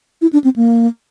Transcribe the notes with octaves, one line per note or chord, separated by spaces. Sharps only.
E4
D4
C4
A#3